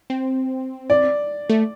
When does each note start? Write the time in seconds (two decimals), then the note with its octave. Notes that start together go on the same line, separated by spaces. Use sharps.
0.10 C4
0.90 D5
1.49 A3